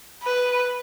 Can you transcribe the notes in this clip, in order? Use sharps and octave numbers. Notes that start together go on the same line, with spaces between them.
B4